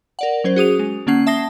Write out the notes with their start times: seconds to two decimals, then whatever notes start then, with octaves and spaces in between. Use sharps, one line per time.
0.19 A#4 D5 F#5
0.44 F#3 C#4 C5
0.56 F#4 G#4 D#6 F7
0.79 G#3
1.07 D3 A#3 C#4 F#5 C7
1.27 E5 A5 D#6 A#6 C7 G7